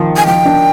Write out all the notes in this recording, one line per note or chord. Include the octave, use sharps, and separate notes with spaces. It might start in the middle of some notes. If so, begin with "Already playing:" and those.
Already playing: D#3 F3
G#5
F3 G5
D4